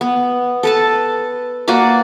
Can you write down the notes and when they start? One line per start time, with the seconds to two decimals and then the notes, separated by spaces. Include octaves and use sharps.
0.01 B3
0.63 A4 B4 A5
1.68 A#3 F#4 B4 D5